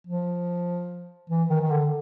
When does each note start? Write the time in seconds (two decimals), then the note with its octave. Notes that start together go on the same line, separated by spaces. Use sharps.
0.07 F3
1.30 E3
1.50 D#3
1.62 D#3
1.71 D3